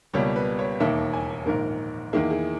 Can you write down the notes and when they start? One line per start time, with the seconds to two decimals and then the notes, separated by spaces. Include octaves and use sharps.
0.14 C#2 B2 G3 A#3 C#5
0.36 B4
0.59 C#5
0.80 E1 D#2 D#3 A#3 E5
1.13 G#5
1.46 A#1 G#2 D#3 A#3 A#4
2.13 E2 D#3 A#3 E4 G#4
2.30 G#4